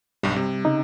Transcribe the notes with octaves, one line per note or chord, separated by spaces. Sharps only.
B1 G2 G3
C3
C#3 D#4